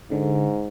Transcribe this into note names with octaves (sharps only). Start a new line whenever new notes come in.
G#2 D3